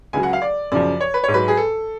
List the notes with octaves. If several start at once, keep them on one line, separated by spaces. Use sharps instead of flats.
C#2 C#3 F#3 G#5
F#5
F5
D5
F#2 C#3 F3 D5
C#5
B4
G#2 C#5
F#3 B4
G#4
A4